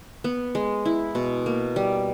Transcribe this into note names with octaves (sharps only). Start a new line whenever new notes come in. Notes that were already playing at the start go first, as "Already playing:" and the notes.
B3
G#3
E4
B2
A#3
G3